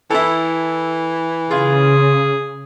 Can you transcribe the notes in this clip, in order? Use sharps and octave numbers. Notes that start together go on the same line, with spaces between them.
E3 E4 A4
C#3 F4 G#4